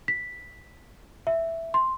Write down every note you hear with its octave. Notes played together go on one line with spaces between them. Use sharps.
B6
E5
C6